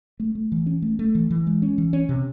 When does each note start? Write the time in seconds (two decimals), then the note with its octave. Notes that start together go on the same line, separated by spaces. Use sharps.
0.20 A3
0.35 A3
0.52 E3
0.66 C#4
0.82 A3
0.99 A3
1.15 E3
1.31 E3
1.47 G#3
1.62 C#4
1.78 E3
1.93 C#4
2.09 C3